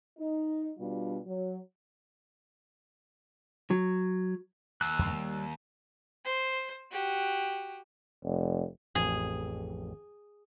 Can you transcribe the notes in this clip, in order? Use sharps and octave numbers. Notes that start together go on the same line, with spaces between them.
D#4
B2 G3 D4 F4
F#3
F#3
D#2 E6 F#6
E2 G2 C#3
G3
C5
F#4 G4
F1
A1 F2 G#4